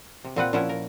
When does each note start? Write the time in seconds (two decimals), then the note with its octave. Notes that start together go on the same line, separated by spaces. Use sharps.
0.25 C3
0.36 A#2 C4 B4 F#5
0.53 A#2 F3 C#4 E4 E5 F#5
0.69 A#4